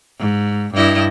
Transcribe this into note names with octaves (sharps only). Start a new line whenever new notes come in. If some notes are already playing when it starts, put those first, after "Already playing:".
G#2
G2 E4 D#5